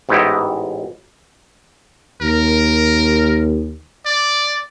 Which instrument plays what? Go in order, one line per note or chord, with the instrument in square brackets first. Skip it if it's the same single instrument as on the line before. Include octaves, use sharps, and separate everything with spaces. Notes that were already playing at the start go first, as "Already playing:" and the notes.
[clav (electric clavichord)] A1 G#2 B3 D#4 E4 G4
[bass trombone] D#2 [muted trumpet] A#4
[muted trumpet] D5